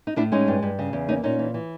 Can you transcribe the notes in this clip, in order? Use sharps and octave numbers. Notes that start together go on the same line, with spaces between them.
D#4
A2 D4 E4
G#3 C#4 D#4
G2
G2
C#3
E2
A#3 C#4 D#4
A#2 C#4 D#4
E3
E3